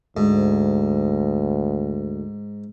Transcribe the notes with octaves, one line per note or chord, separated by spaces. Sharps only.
D2 G#2